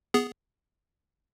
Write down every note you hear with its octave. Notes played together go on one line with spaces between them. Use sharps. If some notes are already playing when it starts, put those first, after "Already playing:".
B3 G#4